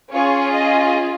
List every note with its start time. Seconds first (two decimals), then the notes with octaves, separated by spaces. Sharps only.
0.12 C#4 F4 G#4 C#5
0.55 D#5